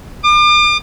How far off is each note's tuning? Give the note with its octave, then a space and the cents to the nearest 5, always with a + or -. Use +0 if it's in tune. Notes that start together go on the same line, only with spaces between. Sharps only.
D6 +40